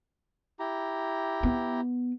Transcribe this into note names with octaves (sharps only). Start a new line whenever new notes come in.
E4 G4 A#5
B3